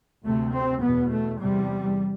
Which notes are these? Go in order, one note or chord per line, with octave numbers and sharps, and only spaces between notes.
D2 C3 A3
C4
E2 B2 B3
A3
E2 C3 G3